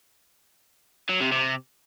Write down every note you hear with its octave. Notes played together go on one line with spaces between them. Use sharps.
F#3
C3
C3